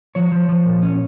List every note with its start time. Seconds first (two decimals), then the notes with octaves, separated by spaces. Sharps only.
0.15 F3 C#5
0.32 F3
0.49 F3
0.65 A#2
0.82 C#4